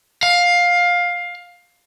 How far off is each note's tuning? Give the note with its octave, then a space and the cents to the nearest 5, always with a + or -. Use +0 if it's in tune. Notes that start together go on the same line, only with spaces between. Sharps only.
F5 +15